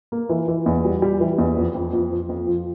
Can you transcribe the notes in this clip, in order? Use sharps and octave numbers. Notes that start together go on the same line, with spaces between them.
A#3
E3
E3
E2
G3
G3
E3
E2
F2
F2
F2
F3
F2
F3